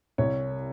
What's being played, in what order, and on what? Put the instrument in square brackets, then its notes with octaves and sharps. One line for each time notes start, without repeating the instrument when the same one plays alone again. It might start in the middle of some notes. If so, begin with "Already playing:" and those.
[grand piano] C2 C#5